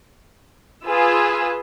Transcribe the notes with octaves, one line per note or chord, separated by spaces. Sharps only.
F4 G#4 B4 E6